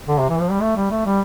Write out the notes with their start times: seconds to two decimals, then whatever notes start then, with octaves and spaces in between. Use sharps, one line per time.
0.08 D3
0.19 C3
0.29 E3
0.40 F3
0.51 G3
0.61 A3
0.76 G3
0.91 A3
1.06 G3